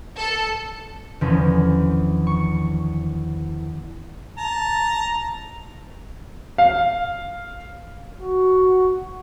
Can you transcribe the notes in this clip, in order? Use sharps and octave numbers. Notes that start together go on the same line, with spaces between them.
A4
E2 D3 D#3 F3 C#4
C#6
A5 A#5
F5
F#4